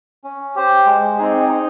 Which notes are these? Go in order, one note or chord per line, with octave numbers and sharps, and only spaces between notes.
C#4
G4 C5
G#3
C4 D#4 G#4
D#4